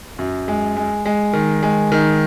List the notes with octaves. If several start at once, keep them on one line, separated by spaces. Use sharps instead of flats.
F#2
G#3
G#3
G#3
D#3
G#3
D#3